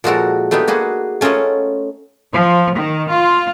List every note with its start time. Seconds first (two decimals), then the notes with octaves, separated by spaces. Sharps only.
0.04 A#2 F3 G#3 F#4 A4 A#4
0.51 A3 B3 D4 D#4 G4
0.68 A#3 F#4 G#4 B4
1.21 A3 C#4 F4 A#4 D#5 F#5
2.33 F3
2.76 D#3
3.10 F4